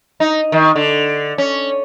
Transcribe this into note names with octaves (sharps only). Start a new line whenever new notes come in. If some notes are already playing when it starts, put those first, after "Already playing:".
D#4
D#3
D3
C#4